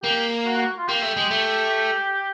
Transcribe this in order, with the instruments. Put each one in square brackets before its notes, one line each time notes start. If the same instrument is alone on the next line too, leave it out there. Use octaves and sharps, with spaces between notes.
[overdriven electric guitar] A#3 [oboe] G4
[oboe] F#4
F#4
F4
[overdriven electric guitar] A#3 [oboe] G4
[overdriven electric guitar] A3
G#3
A3